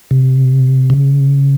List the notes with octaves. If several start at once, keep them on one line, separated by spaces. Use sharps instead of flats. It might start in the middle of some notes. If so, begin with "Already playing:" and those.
C3
C#3